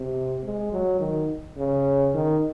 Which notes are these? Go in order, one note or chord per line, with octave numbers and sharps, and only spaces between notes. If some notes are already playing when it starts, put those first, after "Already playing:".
Already playing: C3
G#3
F#3
D#3
C#3
D#3